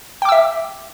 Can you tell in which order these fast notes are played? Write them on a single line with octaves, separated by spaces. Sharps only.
G5 D6 E6 E5